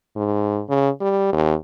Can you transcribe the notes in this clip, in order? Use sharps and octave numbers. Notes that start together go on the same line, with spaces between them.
G#2
C#3
G3
D#2